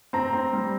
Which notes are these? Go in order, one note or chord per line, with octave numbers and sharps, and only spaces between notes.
C4 A#5
C4
G3